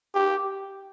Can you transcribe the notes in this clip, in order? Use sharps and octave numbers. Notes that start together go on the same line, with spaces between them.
G4